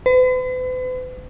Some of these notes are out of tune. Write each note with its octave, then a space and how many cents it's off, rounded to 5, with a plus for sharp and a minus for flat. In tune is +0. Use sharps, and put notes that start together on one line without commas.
B4 +45